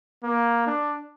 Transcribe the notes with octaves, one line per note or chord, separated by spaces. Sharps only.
A#3
D4